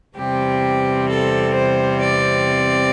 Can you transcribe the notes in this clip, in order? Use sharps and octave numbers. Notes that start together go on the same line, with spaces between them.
E2 C3 G3 C4 G4
A4
C5
D5